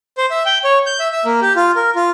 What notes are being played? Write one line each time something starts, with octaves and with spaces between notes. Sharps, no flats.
C5
E5
G5
C#5
G6
E5
E5
A#3
G4
F4
A#4
F4